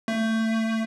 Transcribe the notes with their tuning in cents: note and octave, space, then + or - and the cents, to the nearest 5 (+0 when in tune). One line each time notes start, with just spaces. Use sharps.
A3 +25